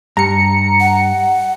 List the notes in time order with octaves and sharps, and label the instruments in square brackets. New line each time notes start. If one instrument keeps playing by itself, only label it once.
[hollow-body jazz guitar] G2 [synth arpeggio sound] A#5 C#7
[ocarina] F#5